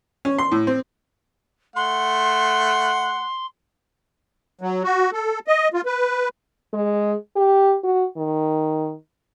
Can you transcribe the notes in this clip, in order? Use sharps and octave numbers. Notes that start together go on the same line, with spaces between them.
C#4
C6
A2
C4
A3 F#5 C6
F#3
F#4
A4
D#5
F4
B4
G#3
G4
F#4
D#3